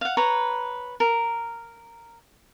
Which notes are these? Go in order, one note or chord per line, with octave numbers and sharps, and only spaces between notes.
F5 F#5
B4 C#5 A#5
A#4